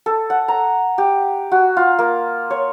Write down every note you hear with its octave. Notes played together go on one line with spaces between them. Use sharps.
A4
F#5
A#5
G4
F#4
F4
A#3
C#5